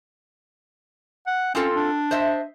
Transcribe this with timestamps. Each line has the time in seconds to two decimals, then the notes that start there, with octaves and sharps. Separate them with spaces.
1.27 F#5
1.55 C4 C#4 F4 A4
1.76 D4
2.11 C5 D#5 E5